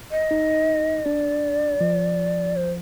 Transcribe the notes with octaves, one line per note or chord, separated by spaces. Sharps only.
D#5
D#4
D4 D5
F3
C5